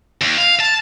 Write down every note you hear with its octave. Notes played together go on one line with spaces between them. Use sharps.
D#2
F5
A5